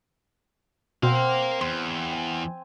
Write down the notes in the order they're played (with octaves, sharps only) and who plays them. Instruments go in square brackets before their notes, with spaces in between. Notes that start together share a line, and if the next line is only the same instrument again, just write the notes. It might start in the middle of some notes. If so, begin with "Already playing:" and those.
[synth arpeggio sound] B2 [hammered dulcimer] C4 F#5 [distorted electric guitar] A#4 F5
[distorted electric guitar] E2 [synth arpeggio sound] C6
[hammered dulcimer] G#5